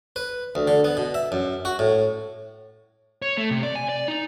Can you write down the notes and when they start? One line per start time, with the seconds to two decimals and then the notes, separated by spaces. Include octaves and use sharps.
0.16 B4
0.55 D2
0.68 D3
0.84 B3
0.97 B2
1.14 E5
1.32 F#2
1.65 F#4
1.79 A2
3.22 C#5
3.37 A3
3.50 C3
3.63 D5
3.75 G#5
3.89 D5
4.08 D#4